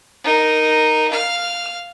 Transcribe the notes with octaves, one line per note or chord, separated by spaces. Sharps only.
D#4 A#4
F5 F6